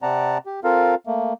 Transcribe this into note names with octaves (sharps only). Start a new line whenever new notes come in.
C3 C4 D5 F#5 A5 A#5
G4
C4 F4 A4 A#4 F5
A3 A#3